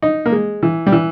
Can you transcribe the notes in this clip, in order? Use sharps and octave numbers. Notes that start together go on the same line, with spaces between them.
D#4
A#3
G#3
E3
G3
E3